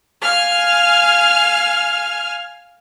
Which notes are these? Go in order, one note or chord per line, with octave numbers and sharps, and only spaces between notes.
F5 G#5 F6